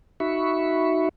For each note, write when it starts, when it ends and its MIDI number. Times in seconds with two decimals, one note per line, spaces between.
0.20 1.09 63
0.20 1.09 66
0.20 1.09 76
0.20 1.09 83
0.20 1.09 85